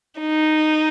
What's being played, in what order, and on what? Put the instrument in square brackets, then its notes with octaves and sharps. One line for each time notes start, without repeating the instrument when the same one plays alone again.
[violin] D#4